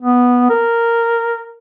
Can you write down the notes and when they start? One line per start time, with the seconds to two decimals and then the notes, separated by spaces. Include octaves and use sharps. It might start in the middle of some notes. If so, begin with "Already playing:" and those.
0.01 B3
0.50 A#4